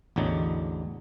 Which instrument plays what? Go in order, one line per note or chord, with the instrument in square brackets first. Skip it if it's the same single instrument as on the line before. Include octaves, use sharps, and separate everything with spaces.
[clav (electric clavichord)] A1 E2 D3 F#3 D#4